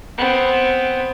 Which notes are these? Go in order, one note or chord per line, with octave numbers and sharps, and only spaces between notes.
B3 C4